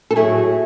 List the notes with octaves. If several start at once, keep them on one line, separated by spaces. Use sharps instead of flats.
A4
A2 F#3 A3 E4 G#4